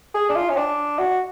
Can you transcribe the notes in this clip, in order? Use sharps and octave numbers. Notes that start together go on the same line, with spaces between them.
G#4
D4
F4
C#4
D4
F#4